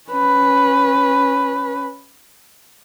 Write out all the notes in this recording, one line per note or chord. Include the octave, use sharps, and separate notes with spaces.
C#4 B4